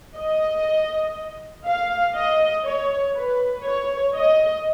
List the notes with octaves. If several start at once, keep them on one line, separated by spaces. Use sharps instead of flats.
D#5
F5
D#5
C#5
B4
C#5
D#5